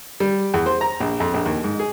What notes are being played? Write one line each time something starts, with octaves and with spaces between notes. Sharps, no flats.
G3
E2
C5
A#5
A#1
F2
A#1
D#2
G#2
G#4